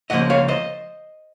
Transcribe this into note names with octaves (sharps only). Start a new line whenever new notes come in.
C#2 C#3 F3 A#3 D#5 F#5
C#5 F5
C5 D#5